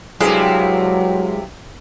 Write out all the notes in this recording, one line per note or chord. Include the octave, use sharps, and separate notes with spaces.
G2 C3 F#3 G#3 E4 F5